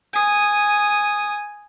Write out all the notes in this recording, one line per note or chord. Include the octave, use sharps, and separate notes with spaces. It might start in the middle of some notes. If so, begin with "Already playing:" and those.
G#5 D#6